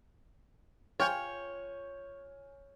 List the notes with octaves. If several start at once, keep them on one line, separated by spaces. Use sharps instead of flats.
F4 C#5 G5 G#5 F6 G6